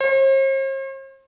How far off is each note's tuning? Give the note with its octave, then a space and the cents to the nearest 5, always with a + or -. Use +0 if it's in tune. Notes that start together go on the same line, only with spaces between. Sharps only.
C5 +45